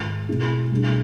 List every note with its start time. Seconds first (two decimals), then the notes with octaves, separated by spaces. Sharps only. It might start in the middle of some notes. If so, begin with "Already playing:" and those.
Already playing: G#1 G#2 G#3
0.28 B2 A3 C4 E4 G#4
0.71 C2 B2 A3 D4 G#4